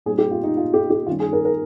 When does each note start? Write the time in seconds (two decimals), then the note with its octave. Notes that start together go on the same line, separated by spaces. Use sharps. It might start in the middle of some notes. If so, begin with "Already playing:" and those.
0.06 A#2 G3 C4 D#4 G#4
0.18 G4
0.31 F4
0.44 D#4
0.57 F4
0.74 G4
0.90 G4
1.06 D#3 G3 C#4 F4
1.20 G#4
1.33 A#4
1.45 A#4